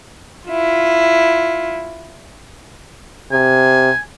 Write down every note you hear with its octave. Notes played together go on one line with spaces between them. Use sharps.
E4 F4
C3 G#5